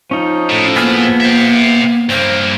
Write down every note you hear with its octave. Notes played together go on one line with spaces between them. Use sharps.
F3 C#4 D#4
A2
A#3 B3 G#4 F6
E5 G5
G2 A#3 C5